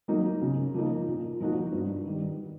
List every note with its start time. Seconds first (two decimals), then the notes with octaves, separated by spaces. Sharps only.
0.08 F#3 A#3 D#4
0.42 C#3
0.74 F3 A#3 D#4
1.08 A#2
1.40 F3 A#3 D#4 F#4
1.72 G2
2.05 D#3 G3